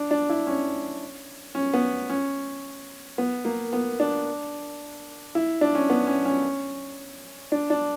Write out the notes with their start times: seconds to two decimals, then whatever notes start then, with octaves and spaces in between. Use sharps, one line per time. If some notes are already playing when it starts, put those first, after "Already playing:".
Already playing: D4
0.11 D4
0.29 E4
0.47 C#4
1.55 C#4
1.74 B3
2.09 C#4
3.18 B3
3.45 A#3
3.73 B3
4.00 D4
5.35 E4
5.61 D4
5.75 C#4
5.90 B3
6.07 C#4
6.25 C#4
7.52 D4
7.70 D4